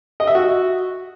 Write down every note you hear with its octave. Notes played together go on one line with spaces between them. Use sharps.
D#5
E5
F#4